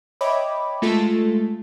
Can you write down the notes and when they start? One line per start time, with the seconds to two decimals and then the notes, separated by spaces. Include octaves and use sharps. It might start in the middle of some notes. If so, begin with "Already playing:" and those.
0.21 C#5 D#5 E5 G5 B5 D6
0.82 G#3 A3 F4 A4